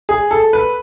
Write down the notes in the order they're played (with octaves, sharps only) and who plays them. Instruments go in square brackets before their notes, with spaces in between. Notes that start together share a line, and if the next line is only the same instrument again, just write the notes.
[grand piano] G#4
A4
B4